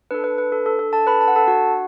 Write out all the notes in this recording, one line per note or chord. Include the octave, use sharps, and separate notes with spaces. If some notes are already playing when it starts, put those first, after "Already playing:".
D4 A4 B4
B4
B4
A4
A4
A4
A4 A5
B4 B5
A5
F#5
A4 A5
F#4 F#5